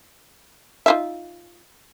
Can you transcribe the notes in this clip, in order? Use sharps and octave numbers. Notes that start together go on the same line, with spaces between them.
D#4 F4 E5